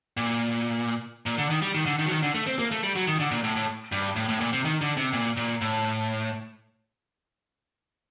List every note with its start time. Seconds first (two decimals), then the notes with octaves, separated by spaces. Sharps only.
0.17 A#2
1.26 A#2
1.38 D3
1.50 D#3
1.62 G3
1.75 D#3
1.86 D3
1.99 D#3
2.06 F#3
2.10 D#3
2.23 D3
2.35 A3
2.47 C4
2.59 A#3
2.71 A3
2.83 G3
2.95 F#3
3.07 D#3
3.19 D3
3.31 A#2
3.44 A2
3.56 A2
3.92 G2
4.16 A2
4.29 A2
4.40 A#2
4.52 C3
4.65 D#3
4.81 D3
4.97 C3
5.13 A#2
5.37 A#2
5.61 A2